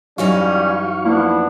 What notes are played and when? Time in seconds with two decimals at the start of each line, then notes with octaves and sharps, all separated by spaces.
0.18 F#2 E3 G3 C#4 D#4 F#4 F5 C#6
1.05 F3 A#3 B3 D4 E4